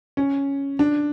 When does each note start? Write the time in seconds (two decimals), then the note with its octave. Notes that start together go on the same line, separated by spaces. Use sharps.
0.17 C#4
0.79 D4